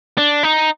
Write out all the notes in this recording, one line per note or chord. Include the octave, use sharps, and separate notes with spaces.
D4
D#4